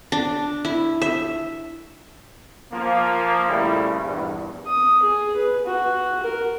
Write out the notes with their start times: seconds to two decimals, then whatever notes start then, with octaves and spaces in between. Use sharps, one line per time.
0.12 D4
0.65 E4
1.02 E5
2.72 F3 A#3
3.49 F2 A#2 C#3 G3 A3 E4
4.05 A#1 E2 G2
4.67 D#6
5.03 G#4
5.36 B4
5.66 F#4
6.23 A#4